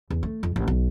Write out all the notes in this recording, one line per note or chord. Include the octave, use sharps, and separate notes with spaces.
E2
A3
F2
A1
B1